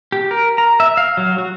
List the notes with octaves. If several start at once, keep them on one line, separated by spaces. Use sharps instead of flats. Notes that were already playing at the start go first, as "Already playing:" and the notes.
G4
A#4
A#5
E5
F5
F#3
F#4